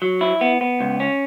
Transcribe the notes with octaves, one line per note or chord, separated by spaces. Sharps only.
F#3
E4
B3
B3
C#2
C#4